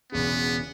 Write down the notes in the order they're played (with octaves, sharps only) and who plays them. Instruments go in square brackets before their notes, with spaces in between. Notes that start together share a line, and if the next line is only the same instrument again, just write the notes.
[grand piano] E1 E2 C#3 [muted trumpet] B3